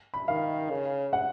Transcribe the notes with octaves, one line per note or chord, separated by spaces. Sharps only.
B5
D#3 F5
C#3
F#5